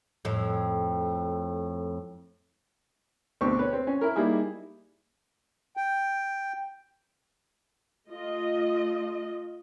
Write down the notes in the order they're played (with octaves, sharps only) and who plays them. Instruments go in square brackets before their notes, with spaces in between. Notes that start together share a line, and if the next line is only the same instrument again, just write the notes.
[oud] F2 A2
[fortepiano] D2 B2 C4 D4 C#6
B4 C#5
C4
C#4
E4 A#4
G3 A#3 D#4 E4 G#4
[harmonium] G5
[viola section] A3 F4 D#5